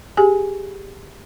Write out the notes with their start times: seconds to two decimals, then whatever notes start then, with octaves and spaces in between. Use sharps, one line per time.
0.17 G4 G#4 G#5